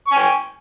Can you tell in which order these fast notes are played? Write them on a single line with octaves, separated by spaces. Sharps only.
C#6 G#5 G5